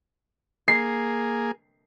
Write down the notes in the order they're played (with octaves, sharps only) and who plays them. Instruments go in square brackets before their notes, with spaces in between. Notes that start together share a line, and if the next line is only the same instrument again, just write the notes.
[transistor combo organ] A#3 G#4 [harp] C7